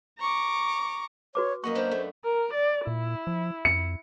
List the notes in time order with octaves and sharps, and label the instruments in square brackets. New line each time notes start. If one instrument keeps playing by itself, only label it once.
[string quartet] A#5 C#6 D6
[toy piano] F#4 B4 D6 [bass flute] C#5
[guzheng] F#2 D#5 F#5 [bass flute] A#3 [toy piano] C#6
[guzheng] B3 D4 [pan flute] C5
[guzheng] A3
[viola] A#4
D5
[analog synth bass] A#2 [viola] E4
[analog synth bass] F3
[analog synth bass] F2 [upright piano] C#7